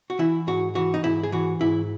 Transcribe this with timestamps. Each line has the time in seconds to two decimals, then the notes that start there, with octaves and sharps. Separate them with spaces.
0.10 F#4
0.19 E3 E4
0.47 G#2 F#4
0.75 E3 F#4
0.94 D#4
1.04 G#2 E4
1.23 G#4
1.32 E3 F#4
1.61 G#2 E4